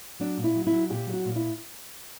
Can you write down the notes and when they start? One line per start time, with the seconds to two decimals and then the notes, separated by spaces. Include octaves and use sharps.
0.20 F#3 D4
0.37 A#2
0.44 E4
0.55 F#3
0.67 E4
0.72 F#3
0.90 A#2 G4
1.07 F#3
1.14 F#4
1.25 A#2
1.36 E4